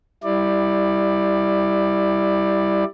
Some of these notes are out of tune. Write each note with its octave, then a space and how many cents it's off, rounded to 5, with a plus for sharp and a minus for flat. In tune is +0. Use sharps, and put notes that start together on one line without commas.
G3 +0 E4 +0 D5 +15